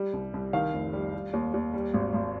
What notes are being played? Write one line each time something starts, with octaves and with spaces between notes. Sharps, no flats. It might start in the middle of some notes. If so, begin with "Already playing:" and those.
Already playing: G3
C2
C2
D#3 F5
F1
G3
G3
D#2
D#2
G3
G#1
G#1